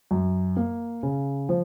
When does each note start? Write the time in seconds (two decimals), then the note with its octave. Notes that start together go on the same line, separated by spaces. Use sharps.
0.11 F#2
0.56 A#3
1.03 C#3
1.49 F3